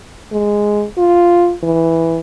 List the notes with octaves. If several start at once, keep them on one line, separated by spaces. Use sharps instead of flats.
G#3
F4
E3